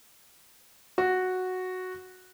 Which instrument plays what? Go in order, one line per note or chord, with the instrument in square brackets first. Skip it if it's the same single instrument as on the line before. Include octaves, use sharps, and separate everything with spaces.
[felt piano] F#4